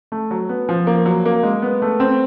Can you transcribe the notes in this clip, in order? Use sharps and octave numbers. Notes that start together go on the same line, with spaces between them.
A3
F#3
B3
F3
A#3
F#3
A#3
G#3
B3
A3
C4